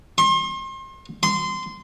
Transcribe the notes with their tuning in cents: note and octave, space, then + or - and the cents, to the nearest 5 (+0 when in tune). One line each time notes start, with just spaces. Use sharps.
C6 +35
C6 -20